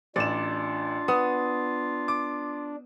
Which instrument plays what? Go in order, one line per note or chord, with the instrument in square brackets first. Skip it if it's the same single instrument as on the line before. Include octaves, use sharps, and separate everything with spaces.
[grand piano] A1 E7 [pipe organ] D4 [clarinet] F4 [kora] D5
[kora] B3 [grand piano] D#6
[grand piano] D6